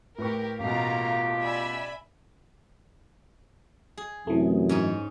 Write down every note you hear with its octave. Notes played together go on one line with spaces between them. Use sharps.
A2 G4 A#4 B4 C#6
A1 B2 A3 A#3 F4 G4 F5 A#5
D5 E5 G#5 B5 E6
G#4
F#2 C3 E3 A3
G#2 C#4 D#4